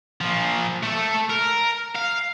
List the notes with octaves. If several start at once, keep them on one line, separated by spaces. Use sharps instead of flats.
A#2 F3
A3 A4
A#4
F5